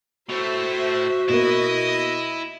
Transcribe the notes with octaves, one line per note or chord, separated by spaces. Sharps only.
A2 A3 F#4 C5 E5
B2 A#3 E4 D#5